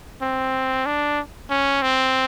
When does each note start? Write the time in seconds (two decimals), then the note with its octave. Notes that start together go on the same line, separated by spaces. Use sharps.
0.21 C4
0.86 D4
1.50 C#4
1.82 C4